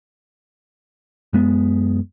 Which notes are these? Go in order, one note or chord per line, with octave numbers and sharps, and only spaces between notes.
F#2 G#3 B3